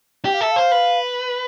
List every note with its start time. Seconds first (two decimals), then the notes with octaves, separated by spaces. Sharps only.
0.25 G4 G5
0.34 F5
0.41 A4 E5
0.51 C5 F5
0.72 B4